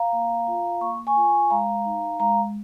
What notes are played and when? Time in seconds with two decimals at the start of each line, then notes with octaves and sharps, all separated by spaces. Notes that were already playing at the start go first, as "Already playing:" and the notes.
Already playing: F5 A#5
0.13 A#3
0.47 F4
0.81 A#3 C#6
1.07 G#5 C#6
1.16 F4
1.50 G#3 F5 A#5
1.85 D#4
2.20 G#3 F5 A#5